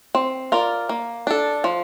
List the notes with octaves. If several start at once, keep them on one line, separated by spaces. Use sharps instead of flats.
C4
F4 A#4 D5
A#3
D4 A4
F3